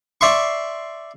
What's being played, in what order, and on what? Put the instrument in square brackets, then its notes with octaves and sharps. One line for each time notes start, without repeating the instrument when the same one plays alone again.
[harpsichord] D5 E5 C6 C#6